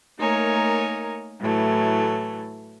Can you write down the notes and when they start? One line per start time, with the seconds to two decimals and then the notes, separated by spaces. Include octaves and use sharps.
0.20 A3 A#3 D#4 A#4 C#5 G#5
1.41 A2 E3 F#3 A3